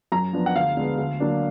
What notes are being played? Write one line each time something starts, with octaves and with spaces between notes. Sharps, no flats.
F#2 A#5
F3 B3 D4
F#5
D2 F5
D3 G#3 B3
D2
D3 F#3 A#3 D4